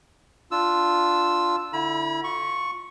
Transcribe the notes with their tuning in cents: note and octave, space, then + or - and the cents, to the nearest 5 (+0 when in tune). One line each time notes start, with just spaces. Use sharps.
D4 +0 F4 +0 E6 +0
D3 +0 E4 +0 B5 -40
F4 +25 C#6 +0